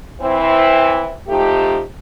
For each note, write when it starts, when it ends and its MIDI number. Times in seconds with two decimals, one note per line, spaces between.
0.21 1.15 52
0.21 1.15 60
0.21 1.15 64
1.28 1.80 53
1.28 1.80 57
1.28 1.80 63
1.28 1.80 67